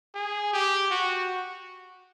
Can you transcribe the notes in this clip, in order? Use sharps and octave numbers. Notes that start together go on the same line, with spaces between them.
G#4
G4
F#4